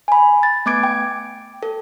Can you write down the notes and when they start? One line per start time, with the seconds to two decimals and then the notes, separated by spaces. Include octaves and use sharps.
0.08 G#5 B5
0.43 A6
0.66 A3 B3 D6 G#6 D7
0.83 G5
1.63 A4